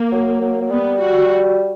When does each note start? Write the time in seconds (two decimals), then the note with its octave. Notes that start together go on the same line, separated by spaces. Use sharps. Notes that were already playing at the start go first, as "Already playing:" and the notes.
Already playing: A#3
0.12 F#3
0.41 F#3
0.61 F#3
0.70 G3 B3
1.00 F#4